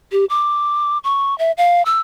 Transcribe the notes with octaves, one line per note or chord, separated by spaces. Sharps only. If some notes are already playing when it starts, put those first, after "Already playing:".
G4
D6
C#6
E5
F5
E6